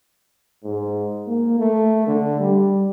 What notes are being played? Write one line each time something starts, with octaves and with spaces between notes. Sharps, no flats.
G#2
A#3
A3
D3
G3